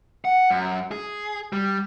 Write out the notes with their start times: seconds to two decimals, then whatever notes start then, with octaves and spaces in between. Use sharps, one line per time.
0.25 F#5
0.50 F#2
0.91 G#4
1.53 G3